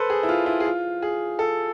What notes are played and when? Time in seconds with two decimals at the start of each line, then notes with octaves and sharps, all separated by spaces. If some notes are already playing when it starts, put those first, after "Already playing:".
Already playing: A4 B4 C5
0.10 G#4
0.23 E4
0.29 F4
0.46 E4
0.60 G#4
0.65 F4
1.02 G#4
1.39 A4